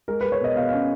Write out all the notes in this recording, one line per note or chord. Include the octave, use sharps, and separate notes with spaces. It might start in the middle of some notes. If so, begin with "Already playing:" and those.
G#3 A#4
G#3 B4
C#5
B2 D#5
B2 F5
C#4 F5